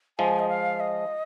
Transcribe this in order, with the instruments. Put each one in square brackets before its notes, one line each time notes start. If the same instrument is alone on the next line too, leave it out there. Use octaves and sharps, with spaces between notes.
[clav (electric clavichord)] F3 G#3 [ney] G#5
[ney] D#5
F5
D#5